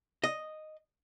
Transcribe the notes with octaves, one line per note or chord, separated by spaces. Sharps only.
D#5